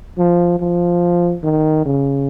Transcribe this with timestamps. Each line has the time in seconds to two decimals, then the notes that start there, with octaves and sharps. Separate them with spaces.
0.18 F3
0.60 F3
1.44 D#3
1.86 C#3